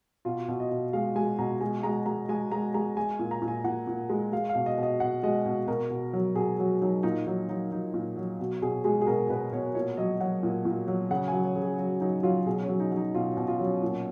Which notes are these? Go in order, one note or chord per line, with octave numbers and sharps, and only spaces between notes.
B2 F4
B2
D#5
B2
G#3 F5
G#3 G#5
B2 A#5
G#3 G#5
G#3 A#5
G#3 A#5
G#3 G#5
G#3 A#5
G#3 A#5
G#3 G#5
A#2
A#5
A#2
G#5
A#2 F#5
A#2
G#3
G#3 F5
F5
B2
D#5
B2
D#5
B2 F#5
G#3 D#5
B2
B2 A#4
B2
F#3
B2 G#4
F#3 F#4
F#3 D#4
A#2 D#4
F#3 D#4
F#3 D#4
F#3 D#4
A#2
F#3
B2 F#4
B2 G#4
G#3 G#4
G#4
B2 A#4
B2 B4
B2 C#5
A#2 C#5
F#3 D#5
F#3 F#5
A#2
A#2
F#3
C#3 F#5
G#5
F#3
C#5
C#3
G#4
F#3 F#4
F#3 D#4
F#3 F4
B2 G#4
C#4
F#3
D#4
F#3
D#4
B2 F4
C#4
B2
F4
F#3
C#4
A#2